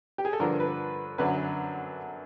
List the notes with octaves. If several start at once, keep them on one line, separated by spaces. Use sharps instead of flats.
G4
G#4
A4
G2 D3 F3 A#4
B4
F#2 D3 F#3 B4